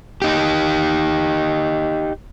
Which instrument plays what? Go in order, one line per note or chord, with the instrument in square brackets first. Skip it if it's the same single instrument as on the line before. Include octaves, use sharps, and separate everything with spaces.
[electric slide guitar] D#4 G4